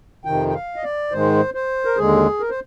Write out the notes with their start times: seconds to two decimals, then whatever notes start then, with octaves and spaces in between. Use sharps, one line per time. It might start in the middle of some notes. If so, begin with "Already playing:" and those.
0.25 F2 C3 D#3 G5
0.48 G5
0.55 F5
0.76 D#5
0.83 D5
1.11 G#2 D#3 G#3 C5
1.54 C5
1.85 A#4
1.97 D#2 D3 G#3 G#4
2.40 A#4
2.50 C5